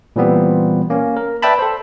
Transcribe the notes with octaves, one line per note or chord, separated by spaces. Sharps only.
A#2 E3 G3 B3 C4
A#3 C#4
A#4
B4 D5 E5 G5 A5 B5
A4 C5